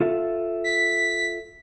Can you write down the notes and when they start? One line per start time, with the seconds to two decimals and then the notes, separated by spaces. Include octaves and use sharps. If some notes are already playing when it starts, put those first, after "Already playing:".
0.01 F4 A4 E5
0.64 B6